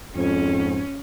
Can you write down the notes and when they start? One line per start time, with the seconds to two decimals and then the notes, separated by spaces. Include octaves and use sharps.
0.16 F2 G#2 C#4